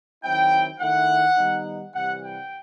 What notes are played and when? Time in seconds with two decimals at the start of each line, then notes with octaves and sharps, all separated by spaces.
0.24 D#3 F#3 C4 E4 G5
0.81 D#3 A3 E4 F#5
1.37 D#3 G3 B3 D#4
1.94 C3 E3 G3 F#5
2.22 G5